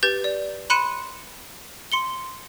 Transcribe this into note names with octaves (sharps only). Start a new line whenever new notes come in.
G4 B4 G6 A6
D5
B5 C6 F#6 C#7 D#7 E7
C6 C#7 G7